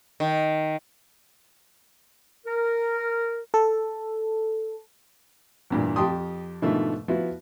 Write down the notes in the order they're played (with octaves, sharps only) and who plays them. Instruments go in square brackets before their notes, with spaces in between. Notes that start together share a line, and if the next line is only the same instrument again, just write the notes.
[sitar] D#3
[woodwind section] A#4
[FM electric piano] A4
[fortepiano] E2 G2 A#2
F2 G4 G5 A5 C6 D#6
G#2 B2 D3 D#3 F3 A3
F3 B3 E4 F#4